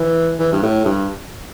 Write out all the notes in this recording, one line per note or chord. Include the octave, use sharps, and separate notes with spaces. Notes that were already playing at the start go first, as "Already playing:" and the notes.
Already playing: E3
E3
G2
A2
G2